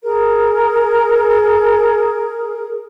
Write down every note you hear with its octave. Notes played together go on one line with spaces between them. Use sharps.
G#4 A#4